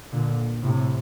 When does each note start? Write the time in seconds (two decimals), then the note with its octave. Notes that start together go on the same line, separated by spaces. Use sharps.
0.13 A#2 D3
0.63 A2 C3